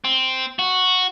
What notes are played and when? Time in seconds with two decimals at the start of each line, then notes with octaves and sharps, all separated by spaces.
0.04 C4
0.59 F#4